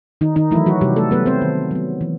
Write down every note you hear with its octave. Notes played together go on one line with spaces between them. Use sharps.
D#3 D#4
D#3 D#4
E3 F#3 A3 E4
F#3 F#4
C3 G3 G4
A3 A4
F#3 A3 B3 B4
C4 C5
D#3
F#3 B3
E3